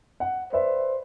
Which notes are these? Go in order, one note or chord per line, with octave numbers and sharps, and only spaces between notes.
F#5
B4 C5 D5 E5